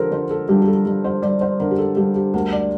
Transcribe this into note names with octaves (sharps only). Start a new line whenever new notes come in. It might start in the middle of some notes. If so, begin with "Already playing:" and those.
Already playing: D3 F3 G4 A4 A#4 C5
D3 C5
A4
G2 G4
G4
A4
G2
C5
G2 D5
C5
D3 A#4
G4
A4
G2 G4
G4
D2 A#4
D5